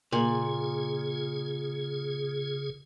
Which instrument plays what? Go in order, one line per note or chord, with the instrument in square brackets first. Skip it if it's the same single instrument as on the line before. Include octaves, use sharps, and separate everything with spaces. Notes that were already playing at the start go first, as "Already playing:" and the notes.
[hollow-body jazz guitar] A#2 [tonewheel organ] C#3 G#4